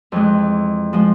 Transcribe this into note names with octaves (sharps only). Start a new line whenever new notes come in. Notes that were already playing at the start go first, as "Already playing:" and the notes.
F2 E3 G#3
F3 G#3